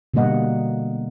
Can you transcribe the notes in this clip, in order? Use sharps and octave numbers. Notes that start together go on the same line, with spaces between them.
B2 D3 G3 A#3 D#5 F#5